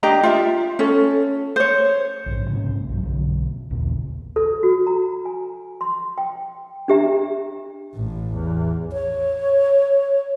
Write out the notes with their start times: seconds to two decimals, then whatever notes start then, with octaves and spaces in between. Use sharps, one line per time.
0.03 D4 G4 D#5 A#5
0.23 F4 E5
0.79 C#4 A4
1.56 C5 C#5
2.26 A#1 G#2 C#3
2.50 G#2 C3 A#3 C#4
2.89 A#1 G2 F#3
3.03 B1 D3
3.70 A1 D#2 A#2 C#3
4.36 A4
4.63 F#4
4.87 A#5
5.25 G#5
5.81 C6
6.18 G5
6.88 D4 G4 E5 A#5
7.95 A1 A2
8.35 E2
8.92 C#5